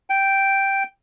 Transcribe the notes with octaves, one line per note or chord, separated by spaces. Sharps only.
G5